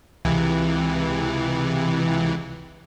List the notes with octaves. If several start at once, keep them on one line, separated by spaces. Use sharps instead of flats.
C#2 C3 E3